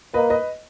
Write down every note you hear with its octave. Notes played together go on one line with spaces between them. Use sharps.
A#3 B4 D#5
B4 D#5